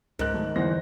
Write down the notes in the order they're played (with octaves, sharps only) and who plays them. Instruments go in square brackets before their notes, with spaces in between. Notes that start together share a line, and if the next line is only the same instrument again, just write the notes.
[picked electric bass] C#2 [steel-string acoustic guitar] G#2 [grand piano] A#4 F#6
[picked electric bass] D#3 F#3 A3
[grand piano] E2 C5 A#6 [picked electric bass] D3 E3 G3